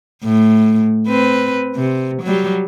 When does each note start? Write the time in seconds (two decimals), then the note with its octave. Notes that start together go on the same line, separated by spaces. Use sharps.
0.24 A2
1.08 C4 B4
1.76 C3
2.23 F#3 G3